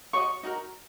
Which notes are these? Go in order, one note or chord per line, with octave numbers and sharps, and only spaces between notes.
F#4 C#5 D#5 C#6
D#4 F#4 A#4